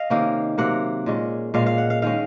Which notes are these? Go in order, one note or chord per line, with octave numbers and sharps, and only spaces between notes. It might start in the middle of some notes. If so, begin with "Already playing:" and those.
Already playing: D#5 F5
C3 D#3 A#3 C#4
C3 F#3 A#3 F#5
A#2 G#3 C#4
A#2 G#3 C#4 F5
F5
F#5
F5
D#3 G#3 C#4 F5